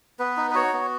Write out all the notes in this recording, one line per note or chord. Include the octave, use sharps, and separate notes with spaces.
B3 B4
D#4
B4
F#4 C#5
B3